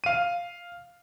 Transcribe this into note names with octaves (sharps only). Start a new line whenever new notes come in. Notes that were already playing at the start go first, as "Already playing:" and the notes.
F5 D#7